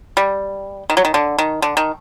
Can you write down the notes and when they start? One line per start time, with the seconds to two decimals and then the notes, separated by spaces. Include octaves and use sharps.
0.17 G3
0.90 D#3
0.97 F#3
1.05 D#3
1.14 D3
1.38 D#3
1.62 D3
1.77 D#3